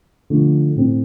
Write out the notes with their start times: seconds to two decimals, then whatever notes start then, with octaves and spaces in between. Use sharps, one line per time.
0.30 D3 F3 A3
0.76 A2 A3 C4